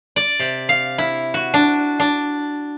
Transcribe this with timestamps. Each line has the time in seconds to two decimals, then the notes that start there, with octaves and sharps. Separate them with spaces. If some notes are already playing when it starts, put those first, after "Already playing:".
0.16 D5
0.40 C3
0.69 F5
0.98 E4
1.34 F#4
1.54 D4
2.00 D4